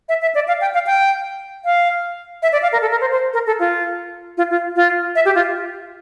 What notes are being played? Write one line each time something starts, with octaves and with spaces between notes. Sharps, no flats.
E5
E5
D5
F5
G5
F5
G5
F5
E5
D5
F5
A#4
A4
A#4
C5
C5
A#4
A4
F4
F4
F4
F4
E5
G4
F4